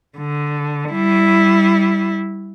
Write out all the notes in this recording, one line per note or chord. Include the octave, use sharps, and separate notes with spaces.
D3
G3 E4